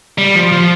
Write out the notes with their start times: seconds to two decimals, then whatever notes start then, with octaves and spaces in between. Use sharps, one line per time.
0.18 G3
0.35 F3
0.52 F3